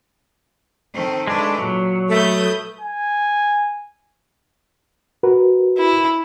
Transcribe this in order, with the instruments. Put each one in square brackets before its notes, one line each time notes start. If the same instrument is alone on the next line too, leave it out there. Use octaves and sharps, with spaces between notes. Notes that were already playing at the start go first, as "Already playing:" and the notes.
[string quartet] D#3 A3 C4
[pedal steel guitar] G#3 D4 [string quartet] A3 B4
[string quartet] A#2 [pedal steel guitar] F#3
[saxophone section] A3 [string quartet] B4 D#6 G6
[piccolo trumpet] G#5
[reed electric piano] F#4 A#4 B4
[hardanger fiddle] E4